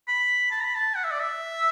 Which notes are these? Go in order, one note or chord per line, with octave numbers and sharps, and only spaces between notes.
B5
A5
B5
A5
F#5
E5
D5
E5